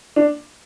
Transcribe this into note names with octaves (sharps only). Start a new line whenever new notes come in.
D4